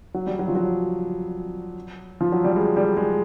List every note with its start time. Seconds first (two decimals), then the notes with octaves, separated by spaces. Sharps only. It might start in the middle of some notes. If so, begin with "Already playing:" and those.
0.14 F#3
0.27 G3
0.39 F#3
0.48 F3
0.55 F#3
2.21 F3
2.32 F#3
2.44 G3
2.56 G#3
2.76 G3
2.97 G#3